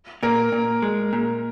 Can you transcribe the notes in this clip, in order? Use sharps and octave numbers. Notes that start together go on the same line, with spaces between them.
A#2 A#4
A#2
G#3
A#2